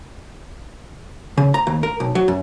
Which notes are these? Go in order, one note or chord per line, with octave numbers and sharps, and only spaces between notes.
C#3
A#5
D#2
A#4
B1
F#3
F#2